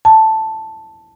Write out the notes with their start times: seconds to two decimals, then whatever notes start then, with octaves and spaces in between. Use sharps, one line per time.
0.05 A5